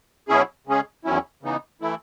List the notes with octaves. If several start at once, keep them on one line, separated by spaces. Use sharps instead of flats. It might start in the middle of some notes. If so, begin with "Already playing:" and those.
B2 F#3 C#4 E4 G#4
C#3 G#3 C#4 G#4
E2 D#3 F#3 C#4 E4
C#3 E3 B3 D#4
E3 A3 E4